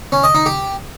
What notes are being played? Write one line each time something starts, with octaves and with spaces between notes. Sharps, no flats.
C#4
D#5
D#4
G4